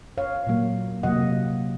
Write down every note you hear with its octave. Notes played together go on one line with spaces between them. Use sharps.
C#5 F5
A#2 F#3 A#3
C3 F#3 A#3 D#5 F#5